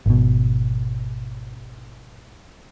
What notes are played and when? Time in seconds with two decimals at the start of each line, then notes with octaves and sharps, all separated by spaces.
0.06 G#1 B2